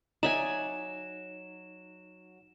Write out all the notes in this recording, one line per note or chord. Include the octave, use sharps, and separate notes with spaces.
F#3 D#4 D5 E5 G#5 E7